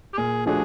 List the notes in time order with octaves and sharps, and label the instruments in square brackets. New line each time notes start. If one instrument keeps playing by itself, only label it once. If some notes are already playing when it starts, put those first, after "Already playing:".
[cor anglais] G4
[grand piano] A#2 [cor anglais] G#4
[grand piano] F3 A3 D4 F#4 [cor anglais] G#4